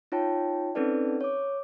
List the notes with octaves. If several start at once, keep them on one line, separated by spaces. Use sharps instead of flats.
D#4 F4 C#5 G5 A5
C4 C#4 D#4 A4 B4 D5
C#5 D6